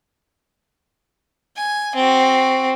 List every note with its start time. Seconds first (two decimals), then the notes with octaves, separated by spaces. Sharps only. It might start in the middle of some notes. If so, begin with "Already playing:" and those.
1.57 G#5
1.95 C4 F#4